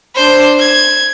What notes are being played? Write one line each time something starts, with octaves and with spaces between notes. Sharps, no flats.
D4 C5
G#6